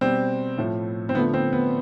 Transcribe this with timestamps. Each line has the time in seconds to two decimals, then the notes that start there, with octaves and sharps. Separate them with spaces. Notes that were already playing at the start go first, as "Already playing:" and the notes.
0.01 B2 G3 C4
0.58 A2 F3 A3
1.09 C4
1.15 D3 F3 A3 B3
1.34 C4
1.53 B3